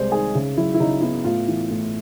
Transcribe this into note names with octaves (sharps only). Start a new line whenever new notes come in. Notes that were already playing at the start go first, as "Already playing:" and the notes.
Already playing: C2 C3 G#3 C5 D5
D#3 G#4
C#3
F#3 E4
E4
C#3 D#4
B3 E4
A2 F4
E3
A2